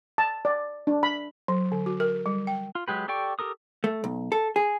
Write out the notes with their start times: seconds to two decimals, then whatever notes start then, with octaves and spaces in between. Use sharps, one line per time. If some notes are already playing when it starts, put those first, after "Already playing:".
0.18 A5
0.45 D5
0.87 D4
1.03 B5
1.48 F#3
1.72 D3
1.86 F#4
2.00 A#4
2.26 G3
2.47 G5
2.75 F4
2.88 F#3 G#3 G4 B4
3.08 G4 A4 D5 G5 C#6
3.39 G4 A4 A#4 D#6
3.84 A3
4.04 B1
4.32 A4
4.56 G#4